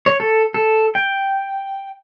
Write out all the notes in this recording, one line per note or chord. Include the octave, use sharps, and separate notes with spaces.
C#5
A4
A4
G5